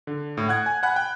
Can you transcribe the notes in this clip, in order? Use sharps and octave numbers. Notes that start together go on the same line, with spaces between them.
D3
A2
F#5 F#6 G#6
G#5
F#5 G#5 B5 F#6
G5